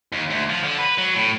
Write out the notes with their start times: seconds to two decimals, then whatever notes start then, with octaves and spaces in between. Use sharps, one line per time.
0.12 D#2
0.30 D2
0.50 F3
0.64 D3
0.78 B4
0.98 F#3
1.16 A2